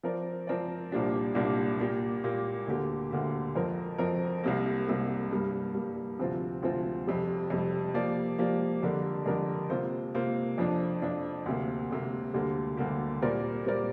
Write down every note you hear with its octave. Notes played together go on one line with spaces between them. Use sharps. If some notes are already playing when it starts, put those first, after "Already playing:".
F3 C4 A#4 D5
F3 C4 A#4 D5
C2 A#2 A#3 D4 G4
C2 A#2 A#3 D4 G4
A#2 A#3 G4
A#2 A#3 G4
D2 D3 A#3 G4
D2 D3 A#3 G4
F2 F3 C4 A#4
F2 F3 C4 A#4
C2 C3 A#3
C2 C3 A#3
G2 G3 A#3
G2 G3 A#3
D2 C3 F3 C4 F4
D2 C3 F3 C4 F4
F2 C3 G3
F2 C3 G3
F3 A#3 G4 D5
F3 A#3 G4 D5
F2 D3 G3 D4 A#4
F2 D3 G3 D4 A#4
C3 A#3 F4 C5
C3 A#3 F4 C5
F2 F3 D4
F2 F3 D4
D2 C3 A#3
D2 C3 A#3
D2 D3 G3 A#3 G4
D2 D3 G3 A#3 G4
A#2 G3 C4 A#4 D5
A#2 G3 C4 A#4 D5